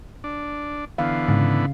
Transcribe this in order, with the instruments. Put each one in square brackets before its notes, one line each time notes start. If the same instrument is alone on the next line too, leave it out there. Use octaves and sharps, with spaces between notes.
[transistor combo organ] D4
[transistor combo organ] D3 E3 B3 [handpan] F5
[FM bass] G#2 [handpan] C#3